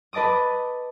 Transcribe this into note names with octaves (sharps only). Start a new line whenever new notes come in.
B4 D#5 A5 D6 D#6